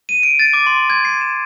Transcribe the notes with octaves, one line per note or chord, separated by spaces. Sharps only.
D#7
D7
A6
D6
C6
G#6
C7
E7